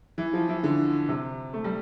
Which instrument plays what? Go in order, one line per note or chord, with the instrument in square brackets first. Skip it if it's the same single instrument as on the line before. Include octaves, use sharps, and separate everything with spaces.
[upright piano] E3
F3
E3
D3
C3
A3
G3